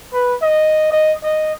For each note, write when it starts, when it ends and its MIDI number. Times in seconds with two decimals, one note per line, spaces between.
0.13 0.35 71
0.42 0.89 75
0.92 1.14 75
1.24 1.53 75